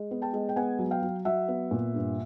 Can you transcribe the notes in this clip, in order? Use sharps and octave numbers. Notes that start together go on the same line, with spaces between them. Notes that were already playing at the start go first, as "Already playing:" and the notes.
Already playing: G#3
B3
G5 A5
G#3
G5
B3 F#5 G#5
F#3
F5 G5
F#3
F#3 E5 F#5
B3
A#2
G2